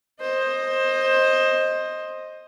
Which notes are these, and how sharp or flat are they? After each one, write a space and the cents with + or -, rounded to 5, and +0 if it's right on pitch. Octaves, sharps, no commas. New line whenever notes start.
C5 +20 D#5 +0